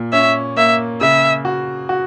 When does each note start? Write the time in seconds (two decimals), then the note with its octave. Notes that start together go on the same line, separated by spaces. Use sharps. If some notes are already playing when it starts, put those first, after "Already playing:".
Already playing: A#2
0.13 C#4 E5
0.57 A#3 E5
1.01 C#3 E5
1.45 F#4
1.89 F#4